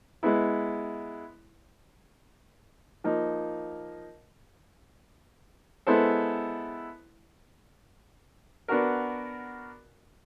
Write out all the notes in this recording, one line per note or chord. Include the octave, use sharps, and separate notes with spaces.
G#3 B3 E4
F3 A#3 D#4
G#3 B3 E4 A4 C5
B3 D4 F#4 A#4